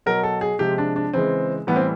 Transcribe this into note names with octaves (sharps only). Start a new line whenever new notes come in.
B2 F#3 A#4
A4
G#4
C3 F3 G#3 G4
D4
D4
C#3 E3 G#3 C4
A2 E3 G3 B3
C4